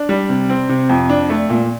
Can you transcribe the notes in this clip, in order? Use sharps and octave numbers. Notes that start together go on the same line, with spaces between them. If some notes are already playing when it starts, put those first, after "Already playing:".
Already playing: D4
G3
C3
C4
C3
F2
D4
A3
A#2